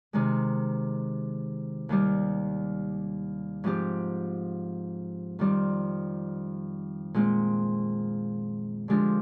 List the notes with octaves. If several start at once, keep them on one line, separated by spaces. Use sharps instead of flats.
C3 D#3 G#3
D#2 D#3 G3
G#2 F3 C4 G4
F2 D#3 G3 C4
A#2 G#3 C4
D3 F3 G#3 D4 G4